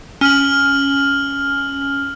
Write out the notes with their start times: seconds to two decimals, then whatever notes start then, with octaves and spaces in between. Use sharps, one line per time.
0.21 C#4 F6 F#7